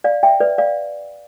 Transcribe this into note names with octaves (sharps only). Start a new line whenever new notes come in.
D5 F5
E5 G5
B4 D5
D5 F5